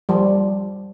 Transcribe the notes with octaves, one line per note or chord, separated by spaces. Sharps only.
F3 G3